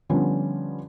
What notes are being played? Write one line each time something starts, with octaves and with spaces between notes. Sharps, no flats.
D3 F3 G3 B3 C#4